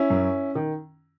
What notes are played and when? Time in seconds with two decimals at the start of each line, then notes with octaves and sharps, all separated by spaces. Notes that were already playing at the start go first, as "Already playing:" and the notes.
Already playing: C#4 E4
0.10 F#2
0.55 D#3